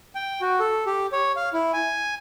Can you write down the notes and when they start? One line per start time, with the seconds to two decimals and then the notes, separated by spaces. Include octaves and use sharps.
0.15 G5
0.41 F#4
0.60 A4
0.86 G4
1.12 C#5
1.36 F5
1.53 E4
1.73 G#5